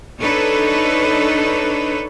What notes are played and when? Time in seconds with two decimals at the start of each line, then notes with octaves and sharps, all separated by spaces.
0.21 D4 D#4 A4 B4 C#5